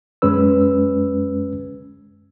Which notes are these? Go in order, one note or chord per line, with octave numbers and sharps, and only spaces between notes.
F#2 G#3 C#4 B4 E6